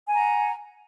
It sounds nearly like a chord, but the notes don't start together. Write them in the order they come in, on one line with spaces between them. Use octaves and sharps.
G#5 A#5 F#5